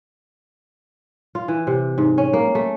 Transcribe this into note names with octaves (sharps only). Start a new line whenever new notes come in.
F4
E3
C3
G#2
C#4
A#3
A3